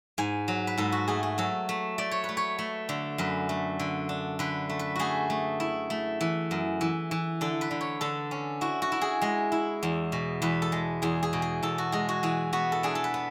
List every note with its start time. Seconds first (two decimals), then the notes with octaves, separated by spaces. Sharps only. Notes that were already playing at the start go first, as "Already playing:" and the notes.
0.18 G#2 G#5
0.48 F#3
0.67 B4
0.78 G#2 A4
0.92 F#4
1.08 A3 G#4
1.23 G#4
1.38 F#3 A4
1.69 A3
1.98 A3 D5
2.11 C#5
2.24 A3 B4
2.37 C#5
2.59 A3
2.89 D3
3.18 F#2 B4
3.49 A3
3.79 D3
4.09 D4
4.39 D3 B4
4.69 A3
4.79 B4
4.96 A3 F#4 G#4
5.30 A3
5.60 E4
5.90 A3
6.21 E3
6.51 F#2
6.81 E3
7.11 E3
7.41 D3 A4
7.61 B4
7.71 D3
7.81 C#5
8.01 D3 A4
8.31 C#4
8.61 E4 F#4
8.82 F#4
8.92 E4
9.02 G#4
9.22 G#3 G#4
9.52 E4
9.83 E2
10.12 B2
10.42 E2 B4
10.62 A4
10.72 G#3
11.02 E2 G#4
11.23 G#4
11.33 B2
11.42 G#4
11.63 E2 A4
11.78 F#4
11.92 G#3 G#4
12.09 F#4
12.23 E3 G#4
12.53 B3 F#4
12.72 A4
12.83 D4 G#4
12.95 A4
13.04 B4
13.14 B3